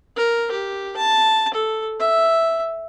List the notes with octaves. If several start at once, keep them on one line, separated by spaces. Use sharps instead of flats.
A#4
G4
A5
A4
E5